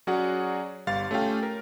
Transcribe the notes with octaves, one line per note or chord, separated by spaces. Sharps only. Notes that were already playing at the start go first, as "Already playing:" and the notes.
F#3 C#4 F#4 G#4 D5 F#5
G1 G3 F5 C6 A6
A3 C#4 F4 G4 F5 G5
A#4 F6